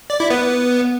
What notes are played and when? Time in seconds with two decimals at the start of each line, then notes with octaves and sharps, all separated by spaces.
0.10 D5
0.20 E4
0.30 B3